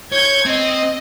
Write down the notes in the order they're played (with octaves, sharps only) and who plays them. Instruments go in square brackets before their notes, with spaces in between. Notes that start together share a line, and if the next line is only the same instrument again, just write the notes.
[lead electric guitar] C#5 [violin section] G6 G#6
[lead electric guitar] C4 [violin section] D#5